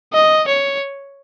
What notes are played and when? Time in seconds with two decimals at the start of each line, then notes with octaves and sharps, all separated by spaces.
0.13 D#5
0.47 C#5